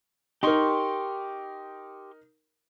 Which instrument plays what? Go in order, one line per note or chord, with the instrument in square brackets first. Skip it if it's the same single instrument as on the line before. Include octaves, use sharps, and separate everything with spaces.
[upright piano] D#4 A#4 [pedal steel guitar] G4 C6 C#6